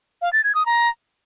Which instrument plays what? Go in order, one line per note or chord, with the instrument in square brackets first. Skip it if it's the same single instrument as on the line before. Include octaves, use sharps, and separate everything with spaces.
[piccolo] F5
A6
G#6
D#6
A#5